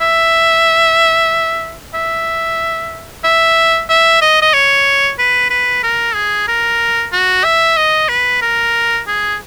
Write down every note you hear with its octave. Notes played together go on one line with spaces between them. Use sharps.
E5
E5
E5
E5
D#5
D#5
C#5
B4
B4
A#4
G#4
A#4
F#4
E5
D#5
B4
A#4
G#4